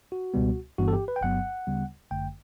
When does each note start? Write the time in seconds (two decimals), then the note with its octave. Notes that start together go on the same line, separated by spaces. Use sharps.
0.12 F#4
0.34 C#2 B2 G3 B3
0.78 G1 G2 E3 B3 F#4
0.88 A4
0.93 G4
1.08 B4
1.16 G5
1.22 G1 G2 F#3 B3 F#5
1.67 D2 C#3 G3 B3
2.11 G1 F#2 D3 A3 G5